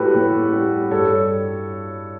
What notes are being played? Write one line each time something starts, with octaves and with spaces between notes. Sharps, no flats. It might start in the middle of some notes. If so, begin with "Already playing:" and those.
Already playing: A2 G3 F#4 G4 A4 B4
A2
G3
G2 A4 C#5